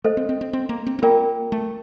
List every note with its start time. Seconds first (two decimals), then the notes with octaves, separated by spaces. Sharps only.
0.04 A3 A4 C5 D#5
0.17 C4
0.29 C4
0.41 C4
0.53 C4
0.69 A#3
0.87 C4
0.99 C4
1.02 A#3 F4 A#4 D5 G5
1.52 A3